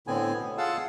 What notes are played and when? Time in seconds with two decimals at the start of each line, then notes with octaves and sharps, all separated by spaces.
0.07 A2 D3 B3 C4 G#5
0.35 B2
0.58 F4 G#4 F5 F#5 A5 E6